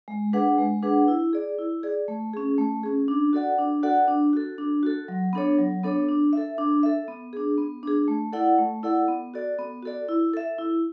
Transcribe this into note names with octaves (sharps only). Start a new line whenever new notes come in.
G#3
D4 G#4 B4 F#5
G#3
D4 G#4 B4 F#5
E4
G#4 D5
E4
G#4 D5
A3
C#4 G#4
A3
C#4 G#4
D4
F#4 A4 D5 F#5
D4
F#4 A4 D5 F#5
D4
F#4 A4
D4
F#4 A4
F#3
B3 D4 A4 C#5
F#3
B3 D4 A4 C#5
D4
A4 E5
D4
A4 E5
B3
D4 G#4
B3
D4 G#4
A3
E4 A4 D5 F#5
A3
E4 A4 D5 F#5
B3
F#4 A4 D5
B3
F#4 A4 D5
E4
A4 E5
E4